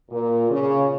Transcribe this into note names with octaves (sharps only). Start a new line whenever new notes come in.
A#2
C#3